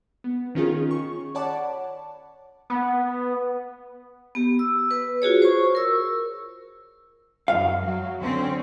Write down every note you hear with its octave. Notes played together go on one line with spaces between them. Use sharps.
B3
D#3 C#4 F4 G#4
C#6
C#5 D5 F#5 A5 B5 D6
B3
B3 G4
E6
B4
F4 F#4 G#4 C#5
C5 C#6
A#4 E6
F#2 F5
F#3
D3 C4 C#4